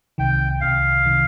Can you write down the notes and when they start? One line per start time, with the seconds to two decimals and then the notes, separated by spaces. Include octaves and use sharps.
0.18 C2 C3 D#3 G5
0.60 C2 C3 D#3 F5
1.05 C3 D#3